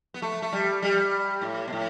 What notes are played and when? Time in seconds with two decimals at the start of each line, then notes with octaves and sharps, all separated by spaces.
0.14 B3
0.22 A3
0.42 A3
0.52 G3
0.82 G3
1.42 A2
1.68 B2
1.73 A2